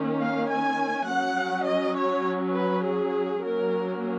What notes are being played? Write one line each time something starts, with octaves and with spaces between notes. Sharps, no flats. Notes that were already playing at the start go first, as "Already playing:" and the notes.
Already playing: D#3 A#3 C#4
F5
G#5
F#3 C#4 F#5
D#5
C#5
B4
G#4
F#3 A#3 C#4 A#4